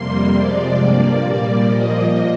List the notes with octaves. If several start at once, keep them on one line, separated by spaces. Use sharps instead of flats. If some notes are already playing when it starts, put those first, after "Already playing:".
Already playing: F2 C3 G3 A#3 C6
C3 F3 G#3 D5
G2 F3 A#3 D5
A#2 G3 A#3
A#2 F3 A#3 D#5